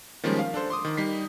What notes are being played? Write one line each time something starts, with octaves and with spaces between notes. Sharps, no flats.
D#3 F3 G3 G#3 A#3 C#4
F5
D4 A4 C5
C6 D6 D#6
D#3
G3 D#4 B6 C7